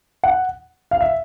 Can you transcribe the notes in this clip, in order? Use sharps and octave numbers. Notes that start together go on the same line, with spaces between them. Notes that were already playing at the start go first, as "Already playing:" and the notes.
F#5
F5
E5